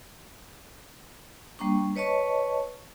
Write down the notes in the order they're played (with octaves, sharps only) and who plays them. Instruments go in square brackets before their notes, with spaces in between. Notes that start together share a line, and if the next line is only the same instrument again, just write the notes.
[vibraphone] G3 A#3 D4 C#6
B4 C#5 D#5 A5 C#6